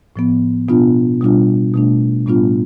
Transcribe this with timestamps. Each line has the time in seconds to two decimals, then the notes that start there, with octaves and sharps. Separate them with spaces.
0.16 A2 F3 B3
0.68 B2 B3 D4 F4
1.21 B2 G3 D4 F4
1.74 B2 A3 D4
2.26 A2 G3 B3 D4 F4